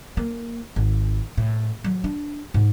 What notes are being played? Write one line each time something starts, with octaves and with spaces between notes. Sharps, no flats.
A#3
G#1
A2
F#3
D4
G#2